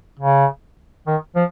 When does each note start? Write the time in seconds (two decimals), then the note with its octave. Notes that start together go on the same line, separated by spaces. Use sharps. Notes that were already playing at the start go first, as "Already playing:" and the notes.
0.19 C#3
1.07 D#3
1.35 F3